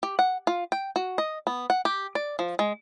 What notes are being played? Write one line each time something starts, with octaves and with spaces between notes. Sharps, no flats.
G4
F#5
F4
G5
F#4
D#5
B3
F#5
G4
D5
F3
G#3